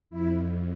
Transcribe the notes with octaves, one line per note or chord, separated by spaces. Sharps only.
F2 E4